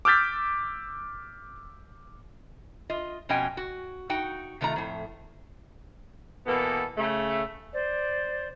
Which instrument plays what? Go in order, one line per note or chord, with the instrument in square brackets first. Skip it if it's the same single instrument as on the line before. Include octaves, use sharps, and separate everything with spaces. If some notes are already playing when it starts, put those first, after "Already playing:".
[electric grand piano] D6 E6 F6 G6 A6 B6
[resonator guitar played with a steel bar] F4 D#5
F2 B2 C#4 D#5 G5 G#5
F#4
D#4 F#4 G5
C3 D#3 A3 F4 A#5
F2 A2
[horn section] B2 E3 A#3 B3 A4
C#3 A3
[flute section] C5 D5